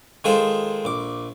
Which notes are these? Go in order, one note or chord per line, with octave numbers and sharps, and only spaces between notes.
D#3 G#3 F4 A4 C5
A#1 D6